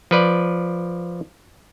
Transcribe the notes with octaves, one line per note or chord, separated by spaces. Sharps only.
F3 B4 D5